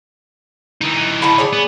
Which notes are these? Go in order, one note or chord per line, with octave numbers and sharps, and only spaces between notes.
E3 D#4
E4 F#5 A5
G#4 C#5 D5
B3